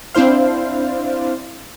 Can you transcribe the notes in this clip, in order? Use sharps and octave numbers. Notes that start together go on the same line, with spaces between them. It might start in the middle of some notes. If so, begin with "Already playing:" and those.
C4 D4 E4 C5 F5